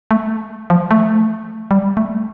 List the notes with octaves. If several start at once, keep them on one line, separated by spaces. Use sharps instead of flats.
A3
F3
A3
G3
A3